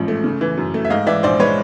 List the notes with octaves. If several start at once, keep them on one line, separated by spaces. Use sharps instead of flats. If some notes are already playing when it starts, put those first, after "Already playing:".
Already playing: A1 G#2 F3
A3
C#3
E3
F#2
A3
E5
G#2 D#5 F5
E3 D5 E5
A#1 C5 D5
G#3 B4 C#5